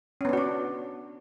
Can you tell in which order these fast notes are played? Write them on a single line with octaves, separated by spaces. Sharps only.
C#4 B3 D4 F#4 D5